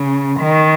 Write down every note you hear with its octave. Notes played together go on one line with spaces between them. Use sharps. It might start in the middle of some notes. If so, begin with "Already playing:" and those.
Already playing: C#3
D#3